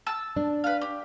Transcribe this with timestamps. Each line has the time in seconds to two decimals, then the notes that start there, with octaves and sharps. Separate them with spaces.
0.06 A5 E6
0.36 D4
0.64 B4 F5
0.81 G4